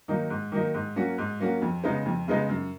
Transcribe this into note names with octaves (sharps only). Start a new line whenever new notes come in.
D#3 F#3 A#3 D#4
G#2
D#3 F#3 A#3 D#4
G#2
F#3 A#3 C#4 F#4
G#2
F#3 A#3 C#4 F#4
F2
C#3 G#3 B3 D#4
F2
C#3 G#3 B3 D#4
F#2